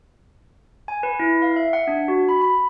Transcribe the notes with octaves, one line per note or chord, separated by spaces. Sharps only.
G#5
B4
E4
F5
E5
F#5
D4
F#4
B5
B5